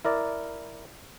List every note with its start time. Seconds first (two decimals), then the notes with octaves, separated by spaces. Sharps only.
0.05 E4 A#4 D5